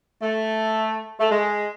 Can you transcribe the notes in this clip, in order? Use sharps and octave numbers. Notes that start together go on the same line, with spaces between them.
A3
A3
G#3